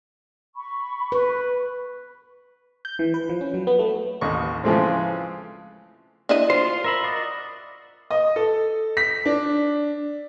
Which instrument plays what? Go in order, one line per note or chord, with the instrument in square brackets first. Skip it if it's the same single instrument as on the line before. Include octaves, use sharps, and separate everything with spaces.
[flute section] B5 C#6
[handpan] B4
[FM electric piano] G6
E3
B4
F3
C#4
F#3
B3
A3
[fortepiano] A1 D#2 D#5 C#6
C#3 E3 F3 G#3 A3 C4
[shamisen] D4 E4 D#5
[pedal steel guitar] F4 C6 [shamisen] C5
[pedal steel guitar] A#4 E5 B5
F#4 D5 D#5
[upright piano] D#5
A4
B6
D4